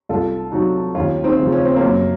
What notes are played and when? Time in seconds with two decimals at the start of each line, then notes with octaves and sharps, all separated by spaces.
0.09 C2 F4 A4
0.52 C3 F#3 D#4 F#4
0.95 D#2 C#4 F4
1.24 C4 D#4
1.39 C#3 F3
1.52 C#4
1.65 C4
1.76 A#3 C#4
1.82 F#2